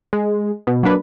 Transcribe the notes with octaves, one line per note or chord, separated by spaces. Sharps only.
G#3
B2
F#3 A#3 D4 B4